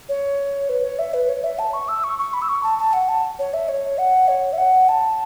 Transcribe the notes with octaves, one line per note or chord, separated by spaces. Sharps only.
C#5
B4
C#5
E5
B4
C#5
E5
A5
C#6
E6
C#6
C#6
B5
E6
C#6
A5
A5
F#5
A5
C#5
E5
C#5
F#5
C#5
E5
F#5
A5